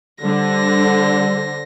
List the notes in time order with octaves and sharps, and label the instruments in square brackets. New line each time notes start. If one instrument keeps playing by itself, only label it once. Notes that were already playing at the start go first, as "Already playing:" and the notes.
[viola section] D3 [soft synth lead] G3 [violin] C5 A#6